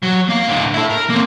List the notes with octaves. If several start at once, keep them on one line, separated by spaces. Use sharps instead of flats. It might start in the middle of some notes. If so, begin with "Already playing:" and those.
F#3
A#3 F5
A2 D3
E4 A4
A#4
A#3 C4